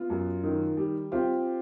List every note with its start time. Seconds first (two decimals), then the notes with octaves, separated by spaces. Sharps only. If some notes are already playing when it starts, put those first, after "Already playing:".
Already playing: B3 F4
0.10 F#2
0.44 D#3
0.77 G3
1.12 C4 F4 G4